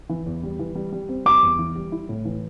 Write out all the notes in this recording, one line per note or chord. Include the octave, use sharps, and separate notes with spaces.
E3
E2
G3
E3
G3
G3
C4
G3 D6
E2
E3
G3
E4
A2
E3